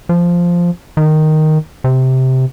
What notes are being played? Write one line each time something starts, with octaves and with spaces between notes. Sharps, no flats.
F3
D#3
C3